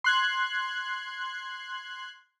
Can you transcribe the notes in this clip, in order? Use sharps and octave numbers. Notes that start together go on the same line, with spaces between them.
C6 F#6 G#6